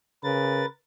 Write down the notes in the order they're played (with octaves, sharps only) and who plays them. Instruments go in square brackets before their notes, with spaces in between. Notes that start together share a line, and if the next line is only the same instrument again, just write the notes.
[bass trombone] C#3 [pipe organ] A#4 B4 A6